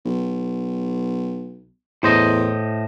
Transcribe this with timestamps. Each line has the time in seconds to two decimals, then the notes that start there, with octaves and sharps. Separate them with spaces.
0.05 B1
2.03 E2 A2 C5 D#5